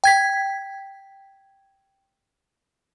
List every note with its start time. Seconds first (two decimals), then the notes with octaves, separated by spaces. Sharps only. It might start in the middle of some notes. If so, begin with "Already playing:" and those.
0.04 G5 G#6 B6